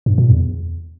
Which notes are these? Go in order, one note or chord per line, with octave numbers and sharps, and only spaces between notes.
G2
A#2
E2